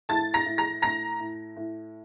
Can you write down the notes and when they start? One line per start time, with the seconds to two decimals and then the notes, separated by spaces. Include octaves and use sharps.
0.09 A2 A5 A6
0.34 A#5 A#6
0.46 A2
0.58 A#5 A#6
0.82 A2 A#5 A#6
1.20 A2
1.56 A2